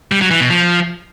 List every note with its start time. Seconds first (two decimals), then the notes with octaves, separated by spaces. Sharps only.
0.12 G3
0.21 F#3
0.31 E3
0.40 B2
0.50 F3